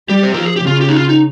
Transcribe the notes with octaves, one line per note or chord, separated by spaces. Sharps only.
G3 G4
C5
F3 A#4
G#4
G4
C#3 F4
G4
D#4
F4
D#4